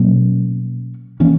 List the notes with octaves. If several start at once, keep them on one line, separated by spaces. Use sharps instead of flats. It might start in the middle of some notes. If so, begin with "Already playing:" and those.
Already playing: B2 F#3 A#3 C#4
E3 A#3 C#4